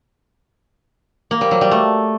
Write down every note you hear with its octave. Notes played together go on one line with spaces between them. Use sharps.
A#3
G3
F#3
G3
A3